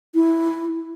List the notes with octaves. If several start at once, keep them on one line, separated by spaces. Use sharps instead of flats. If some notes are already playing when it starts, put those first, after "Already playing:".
E4